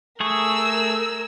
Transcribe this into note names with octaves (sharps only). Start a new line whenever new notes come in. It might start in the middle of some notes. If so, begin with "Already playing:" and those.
A3 G#4 A#4 C#6 E6